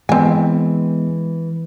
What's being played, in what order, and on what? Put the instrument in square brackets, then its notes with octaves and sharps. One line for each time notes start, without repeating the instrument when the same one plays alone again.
[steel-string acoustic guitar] E3 [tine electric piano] G#3 B3 [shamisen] C4 G#5